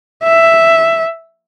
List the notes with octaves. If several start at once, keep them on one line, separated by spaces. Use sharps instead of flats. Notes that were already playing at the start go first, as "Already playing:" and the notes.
E5